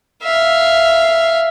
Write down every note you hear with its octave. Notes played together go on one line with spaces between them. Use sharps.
E5 F5